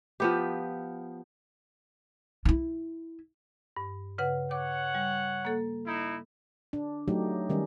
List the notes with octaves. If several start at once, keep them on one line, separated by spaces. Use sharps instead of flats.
F3 B3 G4
E4 F4
G2
C#3 B4 F#5
C#5 F#5 D6
G3
A#3 A4
D#4 E4
D4
F#3 A3 D#4 G4
D#3 G3 C#4